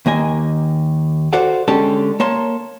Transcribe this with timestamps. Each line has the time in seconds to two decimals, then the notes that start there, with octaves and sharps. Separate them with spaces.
0.06 D#2 A#3 D#5 G#5
1.33 F#4 A4 C5 D5 F5 F#5
1.68 D3 G#3 C#4 G4 A4 A5
2.20 A#3 C#5 A5 C6